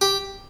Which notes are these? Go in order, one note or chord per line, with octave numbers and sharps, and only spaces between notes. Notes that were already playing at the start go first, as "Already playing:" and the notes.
G4